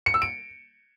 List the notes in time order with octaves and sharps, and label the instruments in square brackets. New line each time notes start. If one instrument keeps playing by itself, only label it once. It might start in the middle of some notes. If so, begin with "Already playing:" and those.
[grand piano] C#7
E6
D7